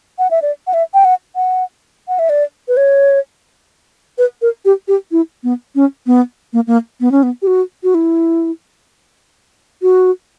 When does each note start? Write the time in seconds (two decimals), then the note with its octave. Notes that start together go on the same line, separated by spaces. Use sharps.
0.19 F#5
0.31 E5
0.42 D5
0.67 F#5
0.74 E5
0.94 G5
1.05 F#5
1.36 F#5
2.08 F#5
2.19 E5
2.30 D5
2.68 B4
2.77 C#5
4.18 B4
4.42 A#4
4.65 G4
4.88 G4
5.12 E4
5.44 B3
5.75 C#4
6.07 B3
6.53 A#3
6.67 A#3
7.00 B3
7.12 C#4
7.23 B3
7.42 G4
7.47 F#4
7.83 F#4
7.95 E4
9.82 F#4